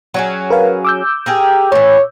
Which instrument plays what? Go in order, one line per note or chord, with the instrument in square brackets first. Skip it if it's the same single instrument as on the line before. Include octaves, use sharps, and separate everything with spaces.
[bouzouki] F#3 C#4 G#4
[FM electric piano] A#4 B4 F5
D6 E6 G6
[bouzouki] G4 G#4 A#4
[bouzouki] A2 E3 [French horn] C#5